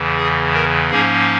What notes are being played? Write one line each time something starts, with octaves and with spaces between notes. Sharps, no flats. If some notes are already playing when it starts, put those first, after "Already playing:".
Already playing: E2 C#3 E3
G#4
A#4
G#2 F3 A#3 C#4 G#4